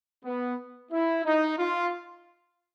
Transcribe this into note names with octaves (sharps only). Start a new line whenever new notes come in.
B3
E4
D#4
F4